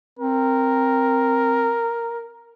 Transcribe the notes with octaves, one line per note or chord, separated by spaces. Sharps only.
C4 A#4